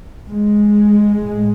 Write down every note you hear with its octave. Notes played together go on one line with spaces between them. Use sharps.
G#3
A2